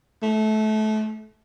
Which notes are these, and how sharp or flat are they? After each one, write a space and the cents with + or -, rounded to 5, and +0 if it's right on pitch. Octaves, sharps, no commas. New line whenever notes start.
A3 -25